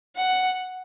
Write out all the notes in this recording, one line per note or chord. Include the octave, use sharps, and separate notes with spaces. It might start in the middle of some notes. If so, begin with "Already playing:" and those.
F#5